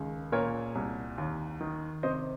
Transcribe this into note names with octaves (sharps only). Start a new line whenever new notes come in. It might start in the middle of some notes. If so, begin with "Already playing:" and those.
Already playing: C#2 D#3
A#2 A#4 C#5
C2
D#2
D#3
C3 C5 D#5